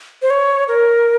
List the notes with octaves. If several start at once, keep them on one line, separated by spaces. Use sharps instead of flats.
C5
C#5
A#4